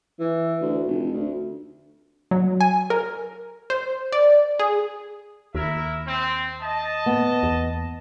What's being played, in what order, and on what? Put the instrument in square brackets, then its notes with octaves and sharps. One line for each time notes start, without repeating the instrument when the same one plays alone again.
[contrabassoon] E3
D2
F1
D2
[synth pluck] F#3
G#5
A#4
C5
D5
G#4
[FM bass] D#2 [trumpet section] E4 A#4 E5
[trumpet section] C4
D#5 A5
[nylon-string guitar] B3
[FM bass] E2